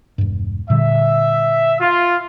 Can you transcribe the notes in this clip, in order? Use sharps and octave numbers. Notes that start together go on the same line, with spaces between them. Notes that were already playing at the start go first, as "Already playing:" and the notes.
E1 G2
A#2 D3 G3 E5
F4